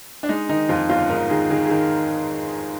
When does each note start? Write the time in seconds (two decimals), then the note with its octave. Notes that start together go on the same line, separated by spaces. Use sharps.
0.23 D4
0.29 G#3 D#4
0.49 D#3 D#4
0.69 F2 F4
0.89 G1 F4
1.10 G#2 A#4
1.30 D#3 G#4
1.50 D#3 G#4
1.65 G#4
1.70 D#3 A#4